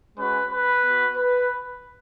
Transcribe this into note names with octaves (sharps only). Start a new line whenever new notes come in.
G#3 C#4 F#4 B4
B4
B3 F#4
B4